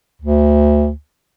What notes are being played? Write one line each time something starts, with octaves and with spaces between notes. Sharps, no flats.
D2